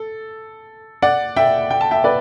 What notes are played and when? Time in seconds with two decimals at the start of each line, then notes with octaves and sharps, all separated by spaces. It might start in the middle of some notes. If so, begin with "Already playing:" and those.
Already playing: A4
1.02 D5 F#5
1.36 E5 G5
1.70 G5
1.81 A5
1.91 E5 G5
2.04 B4 D5